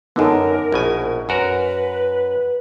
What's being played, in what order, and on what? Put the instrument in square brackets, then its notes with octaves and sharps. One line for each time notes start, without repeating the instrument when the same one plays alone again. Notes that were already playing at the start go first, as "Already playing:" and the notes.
[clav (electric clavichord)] F#2 D3 [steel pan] B3 D#4 A4 [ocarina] A#4
[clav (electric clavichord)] A#1 B2 G#5
[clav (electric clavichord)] F#2 F#4 A#4 [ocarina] B4